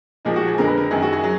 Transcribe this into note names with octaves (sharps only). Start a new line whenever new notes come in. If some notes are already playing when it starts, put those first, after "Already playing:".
A#2 F3 G#3 D#4
F#4
G#4
F2 D3 G#3 A#4
B4
A#4
F#2 D#3 G#3 G#4
F#4
G#4
F#3